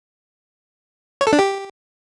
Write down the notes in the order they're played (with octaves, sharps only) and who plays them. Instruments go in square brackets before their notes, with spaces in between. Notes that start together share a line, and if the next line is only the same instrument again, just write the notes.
[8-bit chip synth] C#5
A4
D4
G4